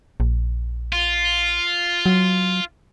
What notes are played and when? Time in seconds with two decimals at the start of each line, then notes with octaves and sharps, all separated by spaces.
0.20 A#1
0.92 F4
2.06 F#3